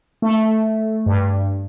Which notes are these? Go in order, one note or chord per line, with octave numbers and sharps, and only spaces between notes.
A3
G2